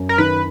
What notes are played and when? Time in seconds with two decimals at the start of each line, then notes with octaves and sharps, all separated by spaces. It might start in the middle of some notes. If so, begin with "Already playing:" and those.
Already playing: F#2
0.09 A#4
0.18 D#3 B4